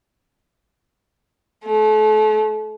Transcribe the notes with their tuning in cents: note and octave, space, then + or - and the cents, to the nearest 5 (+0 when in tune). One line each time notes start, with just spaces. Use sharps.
A3 -35